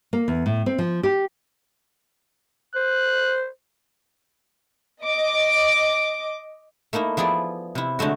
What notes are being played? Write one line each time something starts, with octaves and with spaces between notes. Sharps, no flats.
A#3
E2
A2
C4
F3
G4
C5 F#6
D#5 D6
A3 A#3 D#4 E4
F3 B3 E4 G#4 D5
C3 E4
D3 G#3 A3 F#4